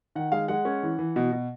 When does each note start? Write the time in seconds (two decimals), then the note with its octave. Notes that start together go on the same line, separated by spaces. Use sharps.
0.15 D#3 F#5
0.32 G#3 F5
0.48 G#3 F#5
0.65 C#4
0.83 E3
0.99 E3
1.16 B2
1.32 B2